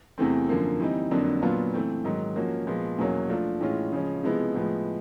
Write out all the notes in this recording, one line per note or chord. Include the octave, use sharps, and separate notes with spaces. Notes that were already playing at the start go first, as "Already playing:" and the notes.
E2 C3 E3 A3 C4
F#2 D3 F3 A#3
E3 G3 C4 D#4
F2 D3 F#3 A#3 D4
A#2 F#3 B3 D4 F4
E3 A3 C4
G#2 D#3 F#3
F3 A#3 C#4 F#4
A#2 F3 G#3 B3
E2 B2 F#3 A#3 C#4
F3 A3 D4 F4
A2 E3 G#3 C#4 F4
C#3 F3 G#3 C#4
C3 F3 G#3 B3 E4
A2 F3 G#3 B3